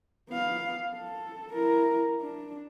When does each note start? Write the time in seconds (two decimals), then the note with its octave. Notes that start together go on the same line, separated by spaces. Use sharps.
0.29 B3 F5
0.97 A4
1.53 E4 A#4
2.21 D4